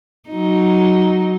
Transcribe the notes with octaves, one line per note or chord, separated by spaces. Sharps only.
F#3 D#4